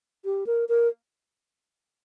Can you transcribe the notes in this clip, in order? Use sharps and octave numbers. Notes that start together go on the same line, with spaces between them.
G4
A#4
A#4